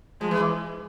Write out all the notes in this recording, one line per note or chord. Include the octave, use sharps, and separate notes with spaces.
F3 G#3
E3